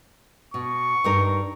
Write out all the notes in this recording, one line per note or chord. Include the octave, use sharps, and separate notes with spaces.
B2 C#6
G2 D#4 A#4